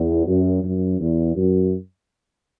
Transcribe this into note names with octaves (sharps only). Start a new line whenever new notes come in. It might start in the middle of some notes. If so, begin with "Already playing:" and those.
Already playing: E2
F#2
F#2
E2
F#2